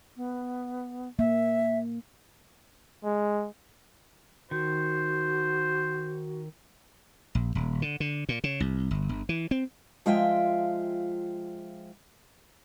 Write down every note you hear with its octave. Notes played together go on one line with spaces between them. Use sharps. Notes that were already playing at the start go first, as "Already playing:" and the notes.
B3
A#3 E5
G#3
D#3 F#4 C5
A#1
D#1
D3
D3
A#2
C#3
C2
G1
G1
E3
C4
F3 G#3 F4 E5 G5